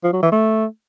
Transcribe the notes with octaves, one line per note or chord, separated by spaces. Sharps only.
F3
F#3
E3
A3